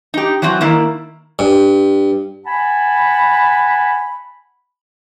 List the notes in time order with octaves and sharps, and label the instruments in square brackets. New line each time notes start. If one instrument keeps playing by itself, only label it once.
[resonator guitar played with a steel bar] D#4 G4
E3 F#3 C4 F#4
D#3 A#3 E4
[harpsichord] G2
[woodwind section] F#5 G#5 A5 B5